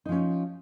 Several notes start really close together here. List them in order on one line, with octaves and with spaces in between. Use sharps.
D#4 F3 C#4